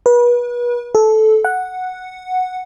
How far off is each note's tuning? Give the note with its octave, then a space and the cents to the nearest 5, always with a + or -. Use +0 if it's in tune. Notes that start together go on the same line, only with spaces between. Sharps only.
B4 -35
A4 -15
F#5 -5